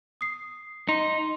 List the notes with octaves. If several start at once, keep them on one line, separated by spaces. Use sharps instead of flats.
D#6 C7
D#4 C6